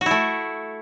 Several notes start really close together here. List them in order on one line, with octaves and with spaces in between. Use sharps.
F#4 E4 A3